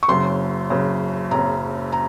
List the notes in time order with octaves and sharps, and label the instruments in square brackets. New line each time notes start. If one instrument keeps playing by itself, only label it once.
[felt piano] C#6
F#1 F#2 C#3 C6
F#1 F#2 C#3
F#1 F#2 C#3 A#5
A#5